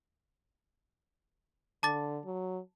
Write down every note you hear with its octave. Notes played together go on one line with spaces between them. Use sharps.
D3 A5 D6 A6
F#3